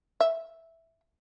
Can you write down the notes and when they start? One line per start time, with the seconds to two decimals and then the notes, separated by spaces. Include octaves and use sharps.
0.20 E5